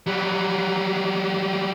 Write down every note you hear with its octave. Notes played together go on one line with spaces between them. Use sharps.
F#3 G3